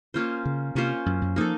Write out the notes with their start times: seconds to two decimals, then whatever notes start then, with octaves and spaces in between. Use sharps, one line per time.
0.14 A#3 C#4 F4 C5
0.45 C#3
0.75 C3 A#3 C#4 F4 C5
1.06 F#2
1.22 F#2
1.36 F3 A#3 D#4 A4